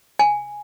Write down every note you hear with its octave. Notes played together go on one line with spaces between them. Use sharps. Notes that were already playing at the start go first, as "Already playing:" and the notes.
G#5